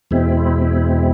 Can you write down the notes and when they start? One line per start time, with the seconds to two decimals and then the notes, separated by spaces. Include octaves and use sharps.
0.11 E2 B2 G#3 C4 E4